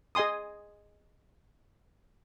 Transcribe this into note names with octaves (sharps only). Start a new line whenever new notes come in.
G#4 D#5 G#5 C6 D#6